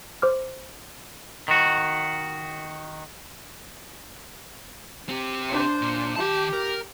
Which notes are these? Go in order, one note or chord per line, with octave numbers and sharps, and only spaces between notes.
C5 D6 F6
D#3 F#4
C4 G4
D4 C5
A#2
D#3 G4 A5
A#4